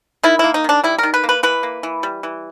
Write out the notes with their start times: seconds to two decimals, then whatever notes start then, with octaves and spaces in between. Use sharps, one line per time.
0.23 D#3 E4
0.39 A#3 E4
0.54 D#4
0.64 D#3 D4
0.84 G3 E4
0.98 D#3 A#4
1.14 B4
1.24 A#3
1.29 B4
1.43 E3 B4
1.63 A#3
1.83 E3
2.03 G3
2.23 E3